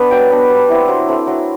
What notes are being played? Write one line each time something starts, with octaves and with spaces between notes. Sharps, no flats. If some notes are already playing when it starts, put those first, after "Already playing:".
Already playing: B3 D4 B4 D5
F#3 G5
B3 D4
G3
C4 E4
F#3 C5
A3 C4
F#3